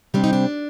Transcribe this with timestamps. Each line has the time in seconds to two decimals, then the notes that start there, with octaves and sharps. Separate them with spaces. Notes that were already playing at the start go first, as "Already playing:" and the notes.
0.14 C3 G3 C4 D4
0.24 D#4
0.33 D4